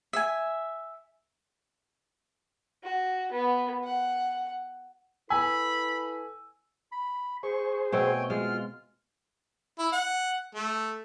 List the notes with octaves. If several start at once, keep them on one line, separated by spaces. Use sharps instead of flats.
E5 G#5
F#4
B3
F#5
E4 A4 B4 G#5 B5 E6
B5
G#4 C5 C#6
B2 A3 C4 C#5 G5 G#5
G#3 F4 F#4 F6
E4
F#5
A3